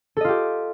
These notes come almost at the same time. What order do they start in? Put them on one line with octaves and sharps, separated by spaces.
A4 D#5 F4 G4